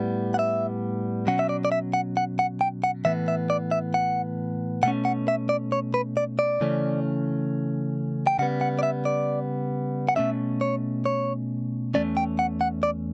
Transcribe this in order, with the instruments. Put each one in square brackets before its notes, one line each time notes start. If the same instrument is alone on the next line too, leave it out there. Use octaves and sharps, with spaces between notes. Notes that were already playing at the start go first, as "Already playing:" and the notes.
Already playing: [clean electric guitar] A2 G3 B3
F#5
E5
B2 F#3 C#4 F#5
E5
D5
D5
E5
F#5
F#5
F#5
G5
F#5
A2 E3 B3 E5
E5
D5
E5
F#5
B2 A3 C#4 F#5
F#5
E5
D5
C#5
B4
D5
D5
C#3 E3 A3 C#4
G5
C#3 G3 B3 F#5
F#5
D5
E5
D5
F#5
B2 A3 C#4 E5
C#5
C#5
E2 D3 A3 C#4 D5
G5
F#5
F#5
D5